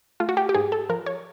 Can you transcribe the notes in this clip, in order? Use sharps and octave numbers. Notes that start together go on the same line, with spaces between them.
A3 F4
F#4
G4
G4
G#2 G#4
A4
F3 A#4
C#5